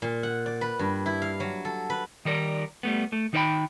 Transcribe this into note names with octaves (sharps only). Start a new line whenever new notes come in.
A#2
F#5
D5
B4
G2
E4
F5
F#3
A4
B4
D#3 G3 A#4 D5
G3 A3 B3
A3
D#3 D#4 B4 D5 G5 B5